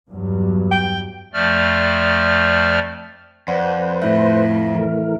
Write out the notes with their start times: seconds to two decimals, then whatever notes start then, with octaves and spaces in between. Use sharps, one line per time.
0.10 E2 G2 F#3
0.71 G5
1.33 F2 F3 A3 D5 F6
3.48 F2 B4 C5 D5 F#5
4.02 A2 E4 E5
4.75 E3 A3 A#4